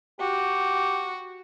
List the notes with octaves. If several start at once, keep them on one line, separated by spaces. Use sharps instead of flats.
F#4 G4